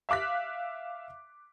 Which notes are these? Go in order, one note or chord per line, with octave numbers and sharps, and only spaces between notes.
E5 F5 D6 F#6 B6